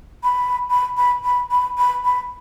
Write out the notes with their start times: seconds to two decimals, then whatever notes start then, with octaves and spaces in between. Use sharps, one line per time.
0.23 B5
0.70 B5
0.97 B5
1.24 B5
1.51 B5
1.78 B5
2.05 B5